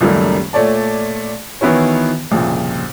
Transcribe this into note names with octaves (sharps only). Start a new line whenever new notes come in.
C#2 F#2 D#3 G3 A3 A#3
A#2 A3 C#5 D5 A5
D#3 E3 B3 E4 F#4 C#5
C2 F2 A#2 C#3